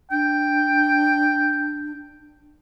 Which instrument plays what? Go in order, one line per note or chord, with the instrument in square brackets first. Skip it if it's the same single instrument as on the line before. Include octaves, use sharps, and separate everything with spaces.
[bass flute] D4 [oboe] G5